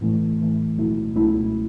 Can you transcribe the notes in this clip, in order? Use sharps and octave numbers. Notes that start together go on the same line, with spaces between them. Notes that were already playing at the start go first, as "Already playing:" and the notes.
A2 E3 A3
A2 E3 A3
C#2 B2 F#3 A3 E4
C#2 B2 F#3 A3 E4